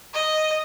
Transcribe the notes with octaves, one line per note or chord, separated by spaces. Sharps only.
D#5